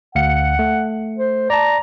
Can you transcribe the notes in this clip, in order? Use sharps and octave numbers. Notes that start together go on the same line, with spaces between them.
D2 F5 F#5 C#7
A3
C5
D5 A5 A#5